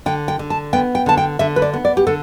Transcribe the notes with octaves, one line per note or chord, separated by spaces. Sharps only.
D3 G5
G5
D3
A5
B3 G5
G5
D3 A5
G5
D3 E5
B4
D5
B3
D5
G4
D3 A4